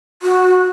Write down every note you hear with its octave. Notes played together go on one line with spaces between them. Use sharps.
F#4